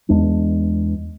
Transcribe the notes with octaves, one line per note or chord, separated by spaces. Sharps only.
E2 G#3 B3 D4